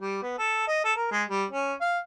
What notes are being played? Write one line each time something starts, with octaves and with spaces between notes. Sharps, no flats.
G3
B3
A4
D#5
A4
A#4
G#3
G3
C#4
F5